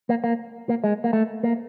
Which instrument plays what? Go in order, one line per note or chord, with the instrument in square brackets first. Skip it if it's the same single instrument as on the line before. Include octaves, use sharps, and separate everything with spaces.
[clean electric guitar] A#3
A#3
A#3
G#3
A#3
A3
A#3